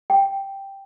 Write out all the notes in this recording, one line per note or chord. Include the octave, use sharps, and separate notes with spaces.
G5